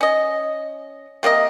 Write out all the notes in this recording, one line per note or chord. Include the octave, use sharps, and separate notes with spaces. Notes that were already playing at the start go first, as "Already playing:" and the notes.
C#4 D#5
C3 A#3 D4 D#5